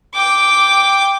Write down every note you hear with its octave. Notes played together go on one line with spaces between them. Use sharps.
G5 D6